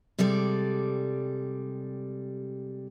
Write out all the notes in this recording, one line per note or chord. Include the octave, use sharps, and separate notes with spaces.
C3 G3 G#3 A4 D5